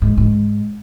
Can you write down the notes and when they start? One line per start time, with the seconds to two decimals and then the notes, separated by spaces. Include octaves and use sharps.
0.02 G#2
0.17 G#2